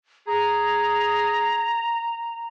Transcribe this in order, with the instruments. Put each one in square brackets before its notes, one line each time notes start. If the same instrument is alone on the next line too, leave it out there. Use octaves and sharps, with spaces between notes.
[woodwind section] G#4 [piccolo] A#5